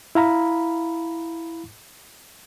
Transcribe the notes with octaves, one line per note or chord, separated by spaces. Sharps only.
E4 F5 A#5 B5